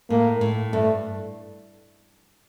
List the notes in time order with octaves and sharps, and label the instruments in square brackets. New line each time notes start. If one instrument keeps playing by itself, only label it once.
[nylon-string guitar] A2 [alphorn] A#3
[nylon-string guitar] A2
[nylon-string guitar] G2 [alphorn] A3